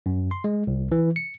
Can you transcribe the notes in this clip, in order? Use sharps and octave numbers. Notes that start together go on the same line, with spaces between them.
F#2
C6
G#3
C2
E3
C#7